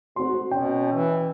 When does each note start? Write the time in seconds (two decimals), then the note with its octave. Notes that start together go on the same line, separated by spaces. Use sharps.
0.16 G#2 A3 C4 F#4 C6
0.51 B2 C#4 G5
0.93 E3